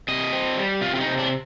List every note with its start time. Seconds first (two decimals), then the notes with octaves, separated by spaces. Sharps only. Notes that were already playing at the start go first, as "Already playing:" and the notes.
0.08 C3 D#5
0.33 C4
0.57 G3
0.81 C3 F4
0.95 F4
1.00 D#4
1.06 C3
1.19 D4